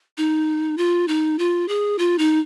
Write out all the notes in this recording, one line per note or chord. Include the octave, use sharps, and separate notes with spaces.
D#4
F4
D#4
F4
G#4
F4
D#4